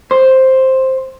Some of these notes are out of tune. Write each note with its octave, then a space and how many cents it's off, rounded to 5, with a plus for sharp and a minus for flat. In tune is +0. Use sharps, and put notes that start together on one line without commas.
C5 +5